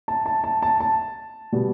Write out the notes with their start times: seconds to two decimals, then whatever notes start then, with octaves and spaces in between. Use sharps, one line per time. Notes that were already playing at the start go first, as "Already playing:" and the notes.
0.08 A5
0.26 A5
0.44 A5
0.62 A5
0.80 A5
1.53 B2 G3